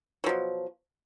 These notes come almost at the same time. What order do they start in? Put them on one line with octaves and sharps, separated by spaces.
F#3 F3 B2